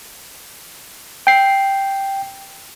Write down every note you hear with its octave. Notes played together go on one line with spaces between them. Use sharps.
G5 C7